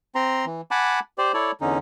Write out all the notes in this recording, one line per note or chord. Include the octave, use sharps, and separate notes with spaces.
C4 A#5 C6
E3
F#5 G#5 A5 B5 D6
G4 C5 D5
E4 A4 C#5 D5
E2 D3 C#4 D#4